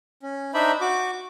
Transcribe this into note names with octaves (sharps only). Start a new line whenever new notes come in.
C#4
D4 D#4 C5 D5 E5 B5
F#4 D6